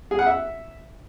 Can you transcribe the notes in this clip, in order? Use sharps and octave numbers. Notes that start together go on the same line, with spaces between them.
G#4
F#5
E5